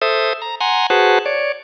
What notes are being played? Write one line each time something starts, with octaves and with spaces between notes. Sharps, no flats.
A4 C5 E5 D#6
A#5
F#5 G#5 A#5 C6
F#4 G#4 B4 C5 F#5 A5
C#5 D5